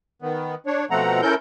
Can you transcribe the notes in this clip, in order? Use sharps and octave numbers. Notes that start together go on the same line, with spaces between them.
D#3 B3
D4 C#5
B2 F3 A3 C4 F#5 A#5
C#4 E4 A4 A#4 G6